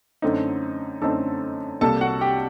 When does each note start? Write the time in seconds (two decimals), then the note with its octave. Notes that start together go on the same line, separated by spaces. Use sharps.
0.22 F#2 D3 A3 C4 D#4
1.02 F#2 D3 A3 C4 D#4 A4 A5
1.81 C2 C3 G3 A#3 A4 A5
2.01 F#4 F#5
2.21 G4 G5